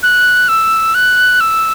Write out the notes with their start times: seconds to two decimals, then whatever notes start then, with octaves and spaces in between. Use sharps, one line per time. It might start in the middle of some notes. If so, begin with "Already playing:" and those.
0.03 F#6
0.48 E6
0.94 F#6
1.40 E6